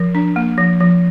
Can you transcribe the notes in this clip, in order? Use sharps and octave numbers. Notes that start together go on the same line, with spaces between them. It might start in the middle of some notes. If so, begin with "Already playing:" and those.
Already playing: F3 A#4
D4
A#3
F3
F3